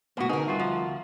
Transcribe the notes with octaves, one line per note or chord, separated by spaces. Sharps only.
B1 A2 A#3 B3 F#4
D3 C4 D#4 G#4 A#4 B4
D2 G3 F4 F#4 C6
F3